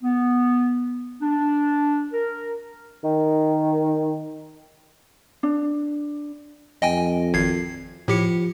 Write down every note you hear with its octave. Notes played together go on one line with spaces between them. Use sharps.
B3
D4
A#4
D#3
D4
F2 D#5 G5 G#5
G#1 G#6 C7
A2 F3 G4 C#7